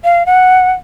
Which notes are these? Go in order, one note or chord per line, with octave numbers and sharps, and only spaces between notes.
F5
F#5